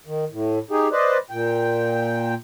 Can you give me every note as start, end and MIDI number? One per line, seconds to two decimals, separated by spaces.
0.06 0.25 51
0.32 0.59 45
0.71 0.88 63
0.71 0.88 67
0.71 0.88 68
0.92 1.17 71
0.92 1.17 72
0.92 1.17 74
0.92 1.17 75
1.31 2.34 46
1.31 2.34 79